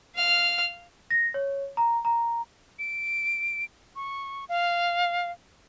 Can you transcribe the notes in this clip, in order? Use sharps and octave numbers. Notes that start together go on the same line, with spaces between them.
F5 F6
A#6
C#5
A#5
A#5
D7
C#6
F5